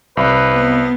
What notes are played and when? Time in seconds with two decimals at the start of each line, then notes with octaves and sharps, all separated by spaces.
0.17 C2 B4
0.53 B3